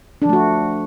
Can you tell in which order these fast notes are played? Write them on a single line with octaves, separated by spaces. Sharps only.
D4 F3 A3 F#4